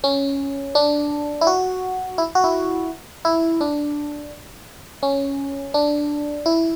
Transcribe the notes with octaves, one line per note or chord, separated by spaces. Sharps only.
C#4
D4
E4
F#4
E4
F#4
E4
E4
D4
C#4
D4
E4